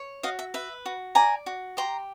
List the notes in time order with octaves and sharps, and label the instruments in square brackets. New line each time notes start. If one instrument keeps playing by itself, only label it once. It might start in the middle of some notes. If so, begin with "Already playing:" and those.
Already playing: [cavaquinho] C#5
F#4 D#5 F5
E5
B4 E5
F#4
D5 G#5 A#5
F#4
G4 A#5 C6